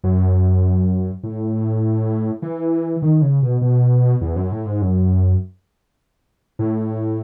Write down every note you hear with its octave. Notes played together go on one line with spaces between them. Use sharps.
F#2
A2
E3
D#3
C#3
B2
B2
E2
F#2
A2
G#2
F#2
A2